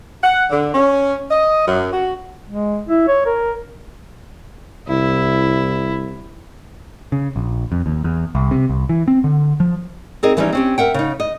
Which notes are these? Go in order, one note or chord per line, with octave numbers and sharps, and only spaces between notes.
F#5
D3
C#4
D#5
F#2
F#4
G#3
E4
C#5
A#4
C2 E4
C#3
A#1
F2
D#2
E2
C2
C3
C2
E3
C4
D3
F3
C4 D#4 G#4 A#4 D#5
D3 E3 F3 G3 C#4 D#4
C4 C#4 G4
A#4 E5 F#5 G5
C#3 D#4
D#5